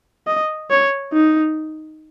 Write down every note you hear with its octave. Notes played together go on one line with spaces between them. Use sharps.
D#5
C#5
D#4